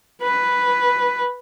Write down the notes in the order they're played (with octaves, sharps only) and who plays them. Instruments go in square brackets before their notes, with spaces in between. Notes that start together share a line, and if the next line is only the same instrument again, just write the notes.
[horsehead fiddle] B4